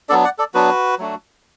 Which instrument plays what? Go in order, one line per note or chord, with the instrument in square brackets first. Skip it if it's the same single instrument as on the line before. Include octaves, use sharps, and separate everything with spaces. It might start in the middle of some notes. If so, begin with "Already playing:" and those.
[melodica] F#3 B3 D4 A4 D5
D5 F#5
A4 D5
F#3 B3 D4 F#4 B4
F#3 A3 D4 F#4